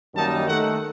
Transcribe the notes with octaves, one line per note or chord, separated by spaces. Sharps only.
F#2 D#3 G3 A#3 D#4 A5
D#3 A3 D#4 F#5